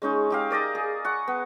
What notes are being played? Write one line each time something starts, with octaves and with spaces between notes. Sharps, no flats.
G#3 C#4 D#4 C#6
D#4 G4 F5
A#4 D5 D#5 A#5
G#4
F#5 C#6
B3